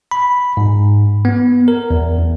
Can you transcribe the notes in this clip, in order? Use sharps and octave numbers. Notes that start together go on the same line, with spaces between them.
B5
G#2
B3
A#4
E2
E2